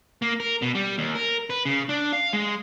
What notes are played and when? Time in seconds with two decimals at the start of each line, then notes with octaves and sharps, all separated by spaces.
0.22 A#3
0.40 A#4
0.62 B2
0.75 G3
0.98 D#2
1.15 A#4
1.50 B4
1.65 C#3
1.89 D4
2.13 F5
2.33 G#3